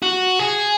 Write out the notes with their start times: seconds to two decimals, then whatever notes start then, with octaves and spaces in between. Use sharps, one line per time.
0.02 F#4
0.39 G#4